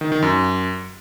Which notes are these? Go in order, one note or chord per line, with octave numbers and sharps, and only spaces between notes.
D#3
D#3
F#2